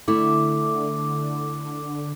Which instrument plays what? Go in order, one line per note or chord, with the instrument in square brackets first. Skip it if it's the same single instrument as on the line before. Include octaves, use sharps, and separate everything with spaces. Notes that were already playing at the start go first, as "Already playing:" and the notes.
[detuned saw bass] D3 [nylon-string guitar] A3 E4 [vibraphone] D6